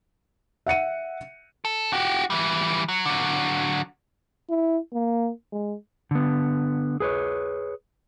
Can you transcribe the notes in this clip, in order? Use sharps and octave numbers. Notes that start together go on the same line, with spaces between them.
E5 F#5 C#7 D#7
A4
F#4 G4
E3 G3
F#3
D3 F#3
E4
A#3
G#3
D3 B3
G#4 B4 C#5